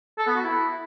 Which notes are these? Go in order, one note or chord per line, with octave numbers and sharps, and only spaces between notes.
A4
B3
F#4
E4